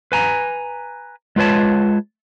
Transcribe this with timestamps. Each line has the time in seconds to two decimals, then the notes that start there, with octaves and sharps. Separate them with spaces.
0.12 B4 G#5 A#5
1.36 G#3 F4 B4 C#5 A5